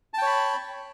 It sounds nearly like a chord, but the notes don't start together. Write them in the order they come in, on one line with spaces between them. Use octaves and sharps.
A5 G5 C#5 B5